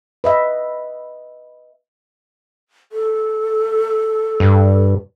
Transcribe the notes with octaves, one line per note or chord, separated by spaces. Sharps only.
B4 D#5 E5
A4
G2